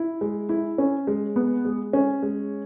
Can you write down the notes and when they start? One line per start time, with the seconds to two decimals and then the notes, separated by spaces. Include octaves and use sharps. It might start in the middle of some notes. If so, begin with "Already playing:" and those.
Already playing: E4
0.21 G#3
0.49 E4
0.78 C#4
1.07 G#3
1.36 B3
1.65 G#3
1.93 C#4
2.23 G#3